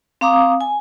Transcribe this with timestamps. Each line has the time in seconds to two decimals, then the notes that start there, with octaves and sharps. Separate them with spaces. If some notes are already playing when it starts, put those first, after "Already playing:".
0.21 C4 F5 A#5 D6 D#6
0.61 G#5